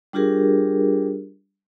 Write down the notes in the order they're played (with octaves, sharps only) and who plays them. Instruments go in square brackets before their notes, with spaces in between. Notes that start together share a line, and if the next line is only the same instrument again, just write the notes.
[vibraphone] G3 D4 F4 G4 G#4 A#4